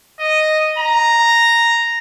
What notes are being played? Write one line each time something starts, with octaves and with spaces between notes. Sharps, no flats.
D#5
A#5